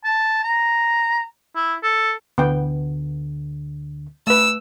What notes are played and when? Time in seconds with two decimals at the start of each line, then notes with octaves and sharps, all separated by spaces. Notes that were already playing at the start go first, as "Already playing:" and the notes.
0.04 A5
0.44 A#5
1.55 E4
1.83 A4
2.38 D2 D3 B3 G5
4.27 A3 B4 E6